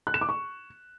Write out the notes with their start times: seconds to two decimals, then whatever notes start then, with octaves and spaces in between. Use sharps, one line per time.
0.07 F#6
0.14 E7
0.21 D6
0.29 C#6